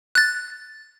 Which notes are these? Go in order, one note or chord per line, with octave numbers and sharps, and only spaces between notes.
F#6 A6